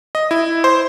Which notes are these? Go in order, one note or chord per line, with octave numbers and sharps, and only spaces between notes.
D#5
E4
C5